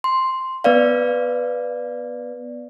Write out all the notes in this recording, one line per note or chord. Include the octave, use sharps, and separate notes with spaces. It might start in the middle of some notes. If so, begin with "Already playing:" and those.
C6
B3 B4 D5 F5